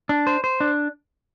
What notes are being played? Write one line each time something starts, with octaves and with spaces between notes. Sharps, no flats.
D4
C5
C5
D4